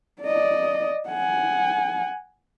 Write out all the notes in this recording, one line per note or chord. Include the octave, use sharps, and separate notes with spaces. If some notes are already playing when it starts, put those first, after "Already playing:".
D5 D#5
F#5 G#5